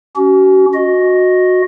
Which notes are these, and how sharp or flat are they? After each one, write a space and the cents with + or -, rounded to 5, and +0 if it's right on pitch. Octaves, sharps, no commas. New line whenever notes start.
C#4 +20 F#4 +40
F#4 -15 D#5 +0